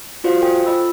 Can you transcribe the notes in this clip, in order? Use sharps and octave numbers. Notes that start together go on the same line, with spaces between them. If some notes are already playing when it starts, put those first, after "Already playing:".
F4 F#4 C5 D5 F5
A4 C5 G5 G#5
F4 D#5 B5 E6